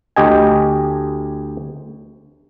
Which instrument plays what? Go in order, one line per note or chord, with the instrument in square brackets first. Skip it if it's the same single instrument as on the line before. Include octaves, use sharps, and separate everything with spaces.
[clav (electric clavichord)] D2 G4 D#5 G#5